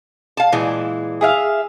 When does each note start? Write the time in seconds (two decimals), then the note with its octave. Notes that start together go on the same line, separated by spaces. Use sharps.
0.37 F5 A5
0.52 A#2 E3 G#3
1.21 G#4 E5 F5